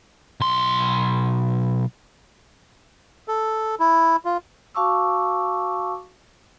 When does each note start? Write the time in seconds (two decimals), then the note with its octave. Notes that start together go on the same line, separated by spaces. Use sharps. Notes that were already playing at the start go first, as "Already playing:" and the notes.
0.40 B1 C6
3.28 A4
3.80 E4
4.25 F4
4.75 F#4 F5 A5 C#6 D6 E6